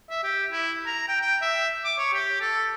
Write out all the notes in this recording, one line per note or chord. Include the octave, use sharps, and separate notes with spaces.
E5
G4
E4
A#5
G5
G5
E5
D6
C#5
G4
A4